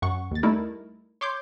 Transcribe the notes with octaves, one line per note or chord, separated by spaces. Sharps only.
F#2 F#5 C#6
D#2 A6
G3 A3 D#4 E4 A#4
C#5 C6 D6 G6